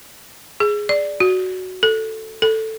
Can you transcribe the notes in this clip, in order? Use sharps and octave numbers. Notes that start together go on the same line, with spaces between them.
G#4
D5
F#4
A4
A4